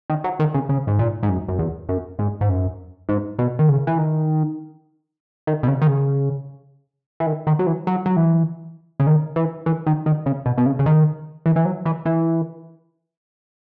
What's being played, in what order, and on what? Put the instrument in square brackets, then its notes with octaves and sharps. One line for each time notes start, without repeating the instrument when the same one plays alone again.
[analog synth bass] D#3
F#3
D#3
C#3
C#3
G#2
A#2
G#2
F#2
F#2
E2
F#2
G#2
G#2
F#2
G#2
B2
D#3
C#3
E3
D#3
D#3
B2
C#3
D#3
C#3
E3
D#3
D#3
F#3
E3
F#3
F#3
E3
C#3
D#3
E3
E3
D#3
D#3
C#3
B2
B2
C#3
C#3
D#3
E3
E3
F#3
E3
E3